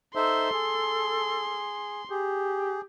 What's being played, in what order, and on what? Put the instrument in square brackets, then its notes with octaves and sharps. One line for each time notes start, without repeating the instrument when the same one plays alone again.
[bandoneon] D#4 C5 E5 [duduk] A4 [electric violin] C6
[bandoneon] G#4
[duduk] G4 [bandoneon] G#4